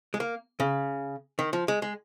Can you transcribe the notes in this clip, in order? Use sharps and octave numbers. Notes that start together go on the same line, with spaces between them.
G#3
A#3
C#3
D#3
F3
G#3
G#3